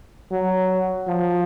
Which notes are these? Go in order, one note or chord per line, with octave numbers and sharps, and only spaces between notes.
F#3
F3